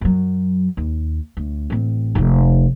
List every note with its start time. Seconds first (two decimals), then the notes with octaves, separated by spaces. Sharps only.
0.01 F#2 F#3
0.77 D#2
1.37 D2
1.70 A1 C4
2.15 F1 F2